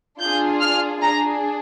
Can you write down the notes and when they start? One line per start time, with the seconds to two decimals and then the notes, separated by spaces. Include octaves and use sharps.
0.20 D4 F4 G#4 G6
0.61 F6
1.02 D4 G#4 A#5